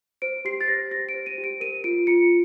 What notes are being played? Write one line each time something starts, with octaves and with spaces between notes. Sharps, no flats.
C5 D7
G4 C7
A6
C5 A#6
G4 A#6
D7
C5
D#7
G4
D7
A#4 D#7
F4 D7
F4 C#7